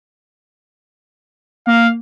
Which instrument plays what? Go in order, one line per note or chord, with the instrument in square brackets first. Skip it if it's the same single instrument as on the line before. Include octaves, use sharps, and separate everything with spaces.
[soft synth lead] A#3 [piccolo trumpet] F5